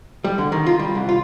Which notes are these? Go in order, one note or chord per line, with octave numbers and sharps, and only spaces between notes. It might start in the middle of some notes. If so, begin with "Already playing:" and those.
G3
D3
D#3
F4
G3
C2
F4